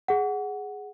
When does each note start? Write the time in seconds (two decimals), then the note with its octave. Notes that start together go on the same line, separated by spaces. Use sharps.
0.08 G#4 F#5